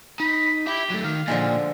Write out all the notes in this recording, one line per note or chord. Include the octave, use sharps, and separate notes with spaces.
D#4 B5
G4 E5 B5
F#3 A3
D#3 F5
A#2 D3 F3 G#3